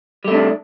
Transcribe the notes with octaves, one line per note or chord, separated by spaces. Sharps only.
C3 G3 A3 D4